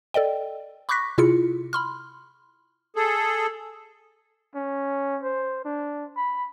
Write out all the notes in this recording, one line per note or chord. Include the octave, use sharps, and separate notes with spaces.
A4 D5 D#5 G5
B5 C#6 D6 F#6 A#6 B6
C3 E4 F4 G#4 C#7
B5 C6 F6
G#4 A4
C#4
C5
D4
B5